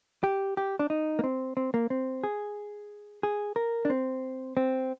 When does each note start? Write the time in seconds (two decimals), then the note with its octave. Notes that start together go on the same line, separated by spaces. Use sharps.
0.24 G4
0.57 G4
0.79 D4
0.90 D#4
1.19 A#3
1.24 C4
1.57 C4
1.74 A#3
1.90 C4
2.24 G#4
3.23 G#4
3.56 A#4
3.85 D4
3.90 C4
4.57 C4